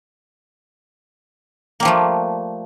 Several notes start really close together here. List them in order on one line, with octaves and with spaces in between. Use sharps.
A#3 G3 F3 A3